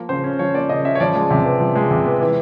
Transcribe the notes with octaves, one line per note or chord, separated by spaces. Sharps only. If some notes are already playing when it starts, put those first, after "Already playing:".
Already playing: F3 A#3 A#4
C#3 C5
C#4
F3 C#5
A#3 D5
C#3 D#5
C#4 E5
C#5
F3 D5
G#3
C3
B3
F3
G#3
C3
B3
E3